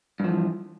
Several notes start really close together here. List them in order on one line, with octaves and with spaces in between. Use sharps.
G2 F3 E3